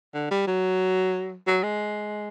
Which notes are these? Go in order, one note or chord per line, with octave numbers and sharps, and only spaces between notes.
D3
G3
F#3
F#3
G#3